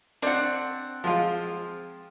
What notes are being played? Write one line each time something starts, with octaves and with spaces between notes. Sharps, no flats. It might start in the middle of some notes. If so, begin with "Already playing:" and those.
C4 D4 F#5
F3 G#3 F4